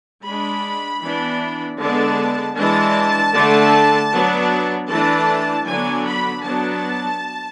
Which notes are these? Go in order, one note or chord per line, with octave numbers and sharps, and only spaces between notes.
G#3 D4 B5
E3 B3 D4
D3 G#3 B3 D4 A5
E3 G#3 D4 A5
D3 A3 D4
F#3 B3 D4
E3 A3 D4 A5
D3 F#3 B3 D4 G#5
B5
F#3 B3 D4 A5